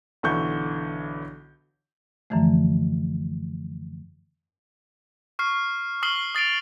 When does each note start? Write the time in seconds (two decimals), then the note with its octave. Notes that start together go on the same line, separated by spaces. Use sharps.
0.23 B1 D3 E3 C#6 G6
2.30 F#2 D3 E3 F3 A3
5.39 C#6 F6 C7
6.03 C#6 D#6 F6 C7 F#7 G7
6.35 D#6 A6 C7 D7 F7